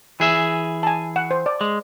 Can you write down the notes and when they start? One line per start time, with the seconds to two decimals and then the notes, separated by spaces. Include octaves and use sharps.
0.20 E3 G#4 E5
0.83 G#5 A5
1.16 F#5
1.31 C5
1.46 D5
1.61 G#3